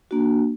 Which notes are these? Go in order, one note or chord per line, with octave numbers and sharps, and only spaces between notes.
A#3 D4 F#4